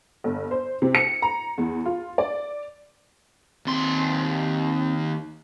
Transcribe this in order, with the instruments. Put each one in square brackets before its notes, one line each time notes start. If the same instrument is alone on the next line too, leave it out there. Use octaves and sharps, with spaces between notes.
[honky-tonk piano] G1
C5
C3
C#7
A#5
E2
F4
D5
[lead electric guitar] D#2 C6 [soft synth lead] C4